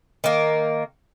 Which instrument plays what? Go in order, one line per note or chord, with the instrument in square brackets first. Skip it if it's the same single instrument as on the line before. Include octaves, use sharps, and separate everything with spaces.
[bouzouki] D#3 A#3